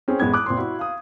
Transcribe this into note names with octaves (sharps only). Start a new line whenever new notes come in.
C4 C#4 G#4
A1 G#3 B3 G#6
D6 D#6 F#6
A#2 C4 C6
E4 F#4
F5 D#6